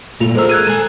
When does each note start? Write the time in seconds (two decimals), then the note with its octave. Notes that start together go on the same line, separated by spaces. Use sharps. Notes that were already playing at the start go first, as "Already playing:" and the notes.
0.20 A#2 A3 F4 F7
0.35 G#3 A4 A#4 C5 E6
0.49 F#6 G#6 D#7
0.67 A4 G#5